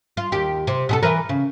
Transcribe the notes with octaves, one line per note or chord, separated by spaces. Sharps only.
F4
D#2 G4
C3
B2 G#4 A4
E3 A#4 B4
C#3